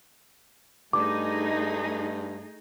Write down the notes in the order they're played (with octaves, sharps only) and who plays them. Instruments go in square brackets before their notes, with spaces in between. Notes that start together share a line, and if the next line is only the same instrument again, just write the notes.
[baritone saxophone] G2 [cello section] A3 D#4 G#4 [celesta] D6